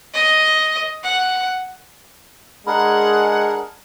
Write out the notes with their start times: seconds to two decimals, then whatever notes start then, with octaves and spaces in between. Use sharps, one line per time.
0.14 D#5
1.04 F#5
2.67 G#3 D4 G#4 A#4 F#5 A#5 B5